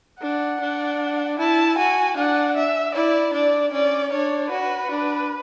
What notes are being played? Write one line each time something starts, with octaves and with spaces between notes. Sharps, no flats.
D4 F#5
D4
E4 A5
F#4 G#5
D4 F#5
E5
E4 D5
D4 D5
C#4 D5
D4 C#5
F#4 B4
D4